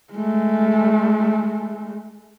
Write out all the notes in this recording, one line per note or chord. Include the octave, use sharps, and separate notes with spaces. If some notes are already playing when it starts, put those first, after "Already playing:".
G#3 A3